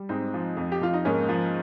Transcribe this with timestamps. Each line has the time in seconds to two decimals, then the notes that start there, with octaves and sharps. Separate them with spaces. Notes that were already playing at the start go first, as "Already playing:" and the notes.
Already playing: G3
0.09 G#2 C4 D#4
0.34 F3
0.57 F2
0.72 G4
0.81 F2 F4
0.94 D#4
1.05 G#2 A#3 C#4
1.29 F3